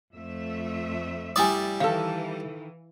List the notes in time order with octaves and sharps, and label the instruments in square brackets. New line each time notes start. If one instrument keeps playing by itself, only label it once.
[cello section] F2 A3 E5
[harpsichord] G3 E4 D5 [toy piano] G#5 D#6
[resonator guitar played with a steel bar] D#3 A4 [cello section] E3 [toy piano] F5